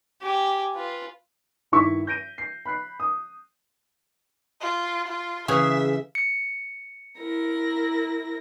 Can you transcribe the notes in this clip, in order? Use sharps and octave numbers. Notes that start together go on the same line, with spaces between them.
G4 G#5
F4 B4
G2 D#3 E4 C#6 E6 B6
G6 A#6 D7 D#7
C7
B5 F#6 C7
D#6
F4
F4
C#3 E3 G#4 E5
C#7
E4 A#4 A#6